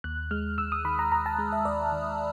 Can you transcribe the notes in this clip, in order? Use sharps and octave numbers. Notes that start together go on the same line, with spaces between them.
D#2 F#6
G#3 F6
D#2 E6
D#6
D#3 B5
A#5
D#2 A#5
A5
G#3
E5
D#2 D5
D#3